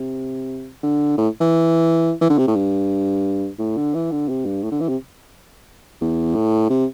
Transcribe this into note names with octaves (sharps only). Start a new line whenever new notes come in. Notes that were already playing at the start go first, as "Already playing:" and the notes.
Already playing: C3
D3
A2
E3
E3
D3
C3
A2
G2
A2
D3
E3
D3
C3
G2
A2
D3
E3
C3
E2
A2
C3